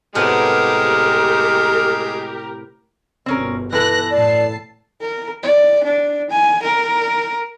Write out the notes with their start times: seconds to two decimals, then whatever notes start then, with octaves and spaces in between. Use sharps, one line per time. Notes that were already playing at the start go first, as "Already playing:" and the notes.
0.15 A2 C3 G#3 B3 G4 A#4 F6
3.26 G1 B2 C4 C#4 A#4
3.72 E3 A4 B4 F#6 A#6
4.10 F#2 A2 D5 A5 C7
5.01 A#4
5.43 D5
5.84 D4
6.30 G#5
6.63 A#4